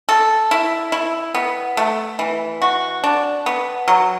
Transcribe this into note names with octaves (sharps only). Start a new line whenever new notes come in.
A4
E4
E4
B3
A3
E3
F#4
D4
B3
F#3